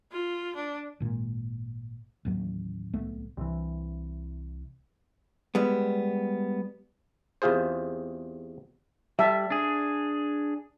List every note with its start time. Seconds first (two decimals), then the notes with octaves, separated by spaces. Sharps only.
0.12 F4
0.55 D4
1.00 G#1 A#2
2.25 A1 D#2 F#3
2.93 D1 C2 A3 B3
3.37 C2 C3 E3
5.55 G3 G#3 B3
7.42 E2 C3 F4 G#4 C5
9.19 G3 E5 A5
9.50 D4 G#4